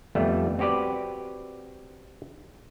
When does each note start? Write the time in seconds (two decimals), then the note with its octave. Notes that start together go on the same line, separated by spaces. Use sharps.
0.15 F2 G3 A3 B3
0.59 C4 F#4 G4 B4 D5